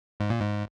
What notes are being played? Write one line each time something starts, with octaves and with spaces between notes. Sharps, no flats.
G#2
A#2
G#2